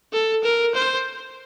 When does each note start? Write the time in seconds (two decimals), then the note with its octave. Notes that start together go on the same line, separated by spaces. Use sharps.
0.13 A4
0.43 A#4
0.75 C5